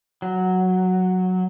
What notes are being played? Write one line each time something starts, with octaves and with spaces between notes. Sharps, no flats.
F#3